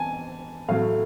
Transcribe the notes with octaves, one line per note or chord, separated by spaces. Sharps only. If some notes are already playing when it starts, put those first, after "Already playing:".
Already playing: B3 G#5 A5
A2 F#3 A3 F5